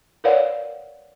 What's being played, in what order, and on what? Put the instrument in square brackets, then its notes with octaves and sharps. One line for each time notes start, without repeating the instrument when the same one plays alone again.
[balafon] A#4 B4 C#5 D5 F5 F#5